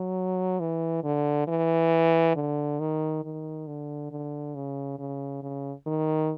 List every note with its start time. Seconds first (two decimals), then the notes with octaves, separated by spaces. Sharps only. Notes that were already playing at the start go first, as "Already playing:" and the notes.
Already playing: F#3
0.60 E3
1.04 D3
1.47 E3
2.36 D3
2.80 D#3
3.24 D#3
3.67 D3
4.11 D3
4.55 C#3
4.99 C#3
5.43 C#3
5.86 D#3